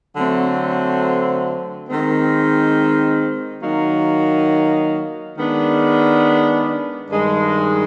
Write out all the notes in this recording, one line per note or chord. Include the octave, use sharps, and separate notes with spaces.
D3 F#3 A3 C4
D#3 G#3 C4
D#3 F#3 A#3 D#4 F#4
D#3 G#3 B3 D4
G2 D#3 G#3